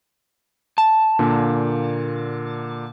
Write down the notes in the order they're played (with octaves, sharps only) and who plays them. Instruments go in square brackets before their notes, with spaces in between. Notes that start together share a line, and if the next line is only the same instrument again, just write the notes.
[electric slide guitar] A5
[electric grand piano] A#2 D3 A#3